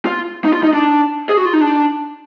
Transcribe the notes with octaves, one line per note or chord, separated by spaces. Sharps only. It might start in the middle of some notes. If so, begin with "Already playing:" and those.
F4
D#4
F4
D#4
D4
G#4
F#4
F4
D#4
D4